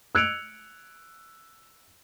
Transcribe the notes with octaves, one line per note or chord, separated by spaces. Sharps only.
E6 F#6 G#6 C#7 D7 F7